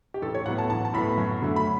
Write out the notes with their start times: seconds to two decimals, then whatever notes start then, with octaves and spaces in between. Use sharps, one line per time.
0.14 G4
0.22 A1 A4
0.35 C#5
0.46 A2 F#3 B3 F#5
0.58 A5
0.70 A1 A5
0.85 A5
0.94 A2 F#3 B3 B5
1.18 F#2
1.42 D3 F#3 A3
1.56 B5